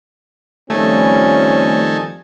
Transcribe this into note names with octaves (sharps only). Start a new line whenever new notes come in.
F2 D#3 F3 G3 A3 C#4 A4 G#5